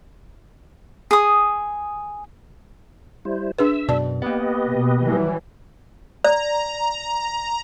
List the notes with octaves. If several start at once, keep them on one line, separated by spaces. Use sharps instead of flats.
G#4 D#6
G3 E4 C5
D4 G#4 B4 E5 E6
F#2 B2 D5 A5
A#3 B3 G4 B4 D#5
B2
E3 F#3 G3
D5 A#5